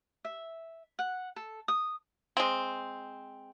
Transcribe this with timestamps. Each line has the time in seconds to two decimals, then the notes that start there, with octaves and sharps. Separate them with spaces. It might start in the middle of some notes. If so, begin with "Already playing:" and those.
0.25 E5
0.99 F#5
1.36 A4
1.68 D#6
2.37 G#3 C4